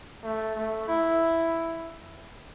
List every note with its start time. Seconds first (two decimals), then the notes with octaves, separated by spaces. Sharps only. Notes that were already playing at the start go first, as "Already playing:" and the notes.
0.23 A3
0.56 A3
0.88 E4